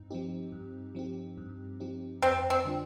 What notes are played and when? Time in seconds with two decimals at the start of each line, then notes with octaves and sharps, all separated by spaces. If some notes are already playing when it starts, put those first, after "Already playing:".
Already playing: G2 C4 D#4
0.10 F3 C4 D#4 G4
0.52 G2
0.95 F3 C4 D#4 G4
1.38 G2
1.80 F3 C4 D#4 G4
2.22 F2 C4
2.50 C4
2.65 D3 G3 D4 F4